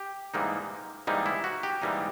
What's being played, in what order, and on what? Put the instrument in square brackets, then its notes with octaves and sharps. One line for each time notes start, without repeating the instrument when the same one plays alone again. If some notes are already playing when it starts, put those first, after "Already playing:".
Already playing: [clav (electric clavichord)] G4
G#2 E3 G3 A#3 D#4
G#2 E3 G3 A#3 D#4
E4
F#4
G4
G#2 E3 G3 A#3 D#4